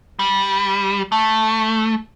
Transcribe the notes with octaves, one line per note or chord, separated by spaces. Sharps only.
G3
A3